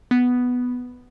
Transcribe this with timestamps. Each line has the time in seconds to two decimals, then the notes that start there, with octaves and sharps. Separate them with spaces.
0.11 B3